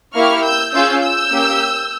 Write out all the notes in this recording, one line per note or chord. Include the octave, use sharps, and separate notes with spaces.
A#3 E4 G4 C#6 F6
E6 G6
C#4 F4 G#4 E6 G6
E6 G6
A#3 C#4 G4